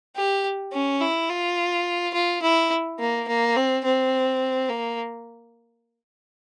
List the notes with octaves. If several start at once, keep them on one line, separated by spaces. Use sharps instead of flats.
G4
C#4
E4
F4
F4
E4
A#3
A#3
C4
C4
A#3